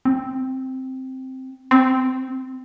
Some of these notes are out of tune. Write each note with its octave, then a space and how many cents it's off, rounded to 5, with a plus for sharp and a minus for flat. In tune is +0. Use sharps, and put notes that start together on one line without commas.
C4 +0
C4 -10